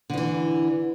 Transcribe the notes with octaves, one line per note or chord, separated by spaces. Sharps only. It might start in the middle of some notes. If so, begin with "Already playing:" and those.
D3 E3 F3